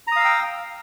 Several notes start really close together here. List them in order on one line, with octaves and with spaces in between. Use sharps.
A#5 D#6 F5 E6 G5